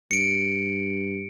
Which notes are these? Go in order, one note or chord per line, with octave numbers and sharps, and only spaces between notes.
G2 C#7 D7